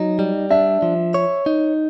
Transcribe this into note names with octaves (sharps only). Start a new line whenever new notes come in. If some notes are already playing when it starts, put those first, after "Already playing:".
Already playing: F#3 D#4
G3
D4 E5
F3
C#5
D#4